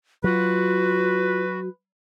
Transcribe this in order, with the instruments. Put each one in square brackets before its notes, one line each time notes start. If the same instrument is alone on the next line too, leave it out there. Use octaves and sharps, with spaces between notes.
[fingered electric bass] F#3 [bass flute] F4 [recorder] F#4 [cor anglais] B4